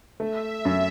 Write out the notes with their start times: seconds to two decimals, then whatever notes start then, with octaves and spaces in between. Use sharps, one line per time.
0.20 A3 E5
0.65 F#2